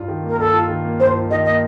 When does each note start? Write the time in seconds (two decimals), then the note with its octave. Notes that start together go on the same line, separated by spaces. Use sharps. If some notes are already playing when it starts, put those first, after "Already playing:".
Already playing: G2 F4
0.08 D#3
0.23 A#3
0.29 A#4
0.38 G2 A4
0.54 F4
0.69 D#3
0.84 A#3
1.00 G2 C5
1.14 F4
1.30 D#3 D#5
1.45 A#3 D#5